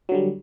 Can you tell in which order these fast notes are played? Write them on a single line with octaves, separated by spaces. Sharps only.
F#3 D3 G3